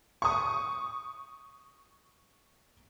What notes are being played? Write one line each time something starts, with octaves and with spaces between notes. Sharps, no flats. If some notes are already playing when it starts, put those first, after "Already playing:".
C#6 D#6